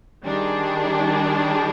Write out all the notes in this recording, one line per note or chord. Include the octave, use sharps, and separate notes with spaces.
D#3 G3 D4 G#4